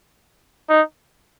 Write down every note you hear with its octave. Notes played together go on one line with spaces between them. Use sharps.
D#4